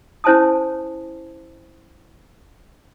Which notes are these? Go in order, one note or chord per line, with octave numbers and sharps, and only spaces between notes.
C#4 E4 C5 G#5 A5 D#6